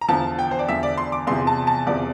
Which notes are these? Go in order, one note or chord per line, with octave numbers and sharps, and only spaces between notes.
A#5
E2 D3 F3 A5
G5
C5
D5
E2 D3 F3 E5
D5
C6
D6
E2 C3 F3 C6
A5
A5
E2 C3 F3 D5